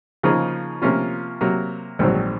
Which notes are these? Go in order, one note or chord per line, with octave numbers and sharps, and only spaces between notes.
C#3 F3 A#3 D#4 G#4
C3 F3 A#3 C#4 F4
C3 F#3 A#3
A#1 G#2 D#3 F#3 C4